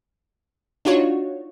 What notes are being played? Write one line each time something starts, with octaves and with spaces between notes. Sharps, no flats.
D4 D#4 F4 F#4 C#5